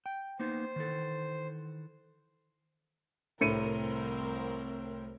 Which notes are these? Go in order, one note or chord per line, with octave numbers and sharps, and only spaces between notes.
G5
A#3 B3 D#4 C5
D#3 E3 A4
C2 A2 C4 A#4 C#7 D#7